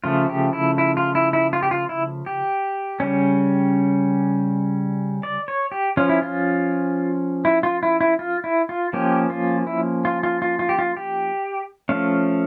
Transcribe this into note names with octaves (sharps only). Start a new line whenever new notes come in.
C#3 F3 A3 F4
G4
E4
E4
F4
E4
E4
F4
G4
F4
E4
G4
C#3 G3 C#4
D5
C#5
G4
F3 C#4 F4
E4
F4
E4
F4
E4
E4
F4
E4
F4
F3 A#3 C#4 G4
F4
E4
F4
F4
F4
F4
G4
F4
G4
F3 A3 C#4 F5